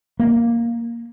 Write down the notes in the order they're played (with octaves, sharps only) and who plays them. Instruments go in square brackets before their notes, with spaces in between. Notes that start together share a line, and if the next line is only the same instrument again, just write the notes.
[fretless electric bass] A#3